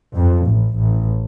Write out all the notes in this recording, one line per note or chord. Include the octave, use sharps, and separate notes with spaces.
F2
A1
A1